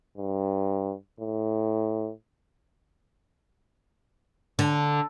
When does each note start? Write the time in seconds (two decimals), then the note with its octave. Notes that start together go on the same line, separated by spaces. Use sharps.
0.18 G2
1.20 A2
4.59 D3